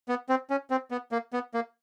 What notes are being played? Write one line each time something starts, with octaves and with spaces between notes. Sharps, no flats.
B3
C4
C#4
C4
B3
A#3
B3
A#3